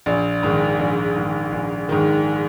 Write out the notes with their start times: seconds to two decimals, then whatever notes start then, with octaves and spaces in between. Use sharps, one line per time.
0.06 A#1
0.43 G#2 D#3
0.79 A#1
1.16 G#2 D#3
1.53 A#1
1.89 G#2 D#3